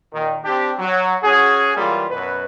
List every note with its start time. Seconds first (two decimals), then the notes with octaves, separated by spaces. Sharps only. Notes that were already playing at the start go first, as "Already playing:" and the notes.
0.13 A#2 D#3
0.45 C4 D4 G4
0.79 F#3
1.23 C#4 F#4 G#4
1.76 E3 F#3 G3 A#3 F4
2.10 F#2 B2 B4